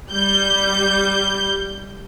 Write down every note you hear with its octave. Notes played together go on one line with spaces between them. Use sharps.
G3 G6